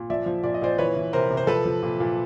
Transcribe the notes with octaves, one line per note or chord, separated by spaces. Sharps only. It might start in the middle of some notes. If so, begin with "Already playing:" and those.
Already playing: A#2
F3 D5 E5
F3
A#2 D5
D#5
A#2 C5 D5
E3 B4 C#5
E3
C3 A#4 C5
C3
C5
F3 A4 B4
F3
A#2
A#2